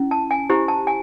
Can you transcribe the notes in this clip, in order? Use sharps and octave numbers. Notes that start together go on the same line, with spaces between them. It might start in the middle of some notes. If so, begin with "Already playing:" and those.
Already playing: C#4 E4
A5
G#5
E4 G4 C5 A#5
A5
G#5